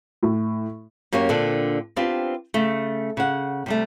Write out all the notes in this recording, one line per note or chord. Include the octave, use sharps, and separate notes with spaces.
A2
F#2 A#3 C#4 G4 C#5
A#2 D3 C4 D4
B3 C4 D4 F4 G4
C#3 A3
C#3 F#5
C3 G3 A3